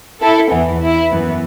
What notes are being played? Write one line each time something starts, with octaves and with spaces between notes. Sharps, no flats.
E4 A4
E2 E3 B3
E4
F#2 E3 B3